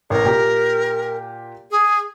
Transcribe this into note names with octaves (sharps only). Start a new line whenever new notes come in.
A1 A#4
A#2 G4 A#5
G#4